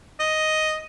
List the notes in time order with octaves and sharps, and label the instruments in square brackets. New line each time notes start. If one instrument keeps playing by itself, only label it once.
[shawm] D#5